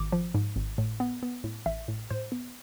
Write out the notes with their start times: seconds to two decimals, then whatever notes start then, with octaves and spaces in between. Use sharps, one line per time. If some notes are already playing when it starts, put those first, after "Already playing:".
Already playing: G#1 D6
0.12 F3
0.34 G#2
0.56 G#1
0.78 A2
1.00 B3
1.23 B3
1.44 A2
1.66 A1 E5
1.88 A2
2.10 A2 C5
2.32 B3